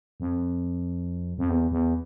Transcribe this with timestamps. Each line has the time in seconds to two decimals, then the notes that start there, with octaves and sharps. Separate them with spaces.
0.20 F2
1.38 F2
1.49 E2
1.71 E2